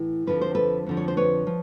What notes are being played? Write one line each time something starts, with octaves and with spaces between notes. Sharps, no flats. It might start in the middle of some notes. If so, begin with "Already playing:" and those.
Already playing: A2 E3
F2 D3 F3 B4
C5
A4 B4
F2 D3 F3
C#5
C5
B4 C#5
F3